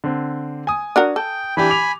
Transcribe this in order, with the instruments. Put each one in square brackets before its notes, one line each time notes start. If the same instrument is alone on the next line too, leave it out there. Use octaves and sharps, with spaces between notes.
[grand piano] D3 C4
G#5 D#6
[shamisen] D4 F#4 A#4
[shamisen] A4 [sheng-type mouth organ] G5
[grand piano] E3 D4 G4 [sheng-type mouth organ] G#5 B5
[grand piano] D6 F7